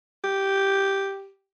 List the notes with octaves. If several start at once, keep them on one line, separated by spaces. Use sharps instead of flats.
G4